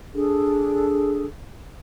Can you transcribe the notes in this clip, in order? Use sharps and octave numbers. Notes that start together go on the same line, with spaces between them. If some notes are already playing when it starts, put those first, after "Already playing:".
D4 G#4 A4